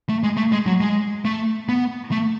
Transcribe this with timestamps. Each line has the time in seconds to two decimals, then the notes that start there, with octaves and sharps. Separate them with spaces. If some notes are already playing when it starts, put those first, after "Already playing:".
0.09 A3
0.23 G#3
0.37 A3
0.52 G#3
0.66 F#3
0.80 G#3
1.25 A3
1.69 B3
2.11 A3